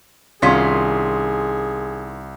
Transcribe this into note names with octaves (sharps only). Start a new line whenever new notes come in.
C2 D#3 C#4 F4 G#4 C6 B6